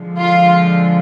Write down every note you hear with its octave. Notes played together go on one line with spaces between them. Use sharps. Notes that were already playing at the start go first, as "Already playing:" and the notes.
Already playing: D3 F3 G#3
F4